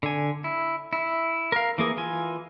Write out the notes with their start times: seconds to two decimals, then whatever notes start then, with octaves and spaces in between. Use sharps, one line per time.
0.03 D3 G#5
0.44 E4
0.93 E4
1.52 A#4 F5
1.78 E3 A#3 G#4
1.97 E3 F4 G#5